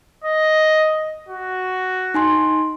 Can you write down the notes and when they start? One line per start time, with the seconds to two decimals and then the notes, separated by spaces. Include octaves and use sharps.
0.24 D#5
1.29 F#4
2.14 D#4 G#5 C6